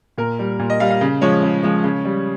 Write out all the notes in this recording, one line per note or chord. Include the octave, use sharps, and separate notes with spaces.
A#2 A#4
G3
A#2
D#5
G3 F5
F5
C#3
F3 G#3 C#5
C#3
F3 G#3
C#3
G3